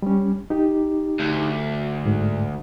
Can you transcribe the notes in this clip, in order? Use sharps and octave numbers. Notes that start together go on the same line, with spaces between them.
G3 C#4
D#4 G4
D2
G#2